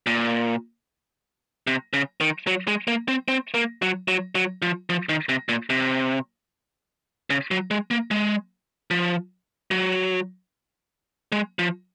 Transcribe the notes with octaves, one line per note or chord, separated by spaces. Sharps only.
A#2
C3
C#3
D#3
F#3
G#3
A#3
C4
C4
A#3
F#3
F#3
F#3
F3
F3
D#3
C3
A#2
C3
C#3
F#3
G#3
A#3
G#3
F3
F#3
G#3
F3